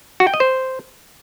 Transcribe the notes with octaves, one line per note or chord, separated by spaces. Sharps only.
F#4
G5
D#5
C5